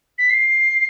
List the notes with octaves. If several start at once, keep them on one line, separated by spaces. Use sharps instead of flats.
B6
C7